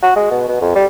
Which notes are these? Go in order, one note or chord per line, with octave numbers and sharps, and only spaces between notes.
F#4
G#3
B2
B2
F2
G3